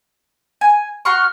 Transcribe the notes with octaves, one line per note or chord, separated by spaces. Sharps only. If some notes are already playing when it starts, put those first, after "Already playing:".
G#5
F#4 C6 C#6 F6